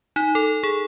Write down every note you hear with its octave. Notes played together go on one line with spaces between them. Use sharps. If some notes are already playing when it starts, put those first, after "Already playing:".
D#4
A4
G#4